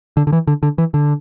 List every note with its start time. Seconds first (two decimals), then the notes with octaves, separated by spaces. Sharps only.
0.17 D3
0.27 D3
0.32 E3
0.47 D3
0.63 D3
0.78 E3
0.94 D3